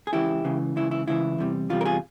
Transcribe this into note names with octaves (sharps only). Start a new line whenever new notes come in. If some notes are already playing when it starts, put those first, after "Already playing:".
G#4
C#2 C#3 E3 E4 G4
C#2 C#3 E3
C#2 C#3 E3 E4
E4
C#2 C#3 E3 E4
E2 C3 G3
E2 C3 G3 F4
A#4
F4 G#4